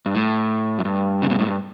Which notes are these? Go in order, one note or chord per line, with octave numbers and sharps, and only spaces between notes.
G2
A2
F#2
G2
C#3
B2
A2
G2